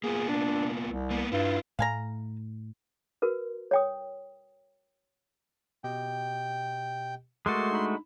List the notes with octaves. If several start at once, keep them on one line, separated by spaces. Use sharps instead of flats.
A#3 B3 F4 G#4
D4
C2
A#3 B3
G2 E4 F4
A2 A3 F5 G#5 A#5
F#4 A#4 B4
C#5 G5 D#6
B2 G4 D#5 G5
G#3 A3 F#4 A#4 C6 D6 A6
D4 D#4 B5